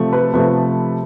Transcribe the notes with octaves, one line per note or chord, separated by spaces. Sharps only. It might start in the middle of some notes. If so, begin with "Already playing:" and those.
Already playing: C3 F3 A3
B4
C3 F3 A3 B4